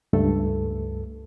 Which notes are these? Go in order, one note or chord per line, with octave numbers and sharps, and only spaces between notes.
C#2 G2 A3 A4